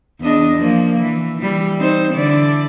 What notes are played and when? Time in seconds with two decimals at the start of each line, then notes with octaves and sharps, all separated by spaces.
0.21 E2 D4 D#5
0.58 F3 A#3
0.99 E3
1.38 E3 G3
1.77 C4 D#4 C5
2.14 D3 E3 D5